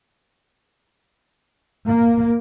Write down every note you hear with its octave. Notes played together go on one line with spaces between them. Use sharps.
A#3